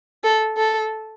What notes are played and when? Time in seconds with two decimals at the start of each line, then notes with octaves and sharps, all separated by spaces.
0.24 A4
0.57 A4